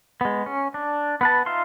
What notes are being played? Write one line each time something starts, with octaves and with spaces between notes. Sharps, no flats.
G#3 B3
C#4
D4
B3 B4 A5
D#4 F4 E5 F5 C6